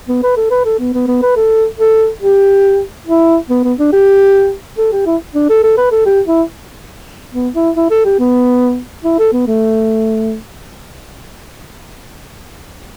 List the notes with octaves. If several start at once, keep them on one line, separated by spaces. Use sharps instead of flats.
B3
B4
A4
B4
A4
B3
B3
B3
B4
A4
A4
G4
E4
B3
B3
D4
G4
A4
G4
E4
D4
A4
A4
B4
A4
G4
E4
B3
E4
E4
A4
G4
B3
E4
A4
B3
A3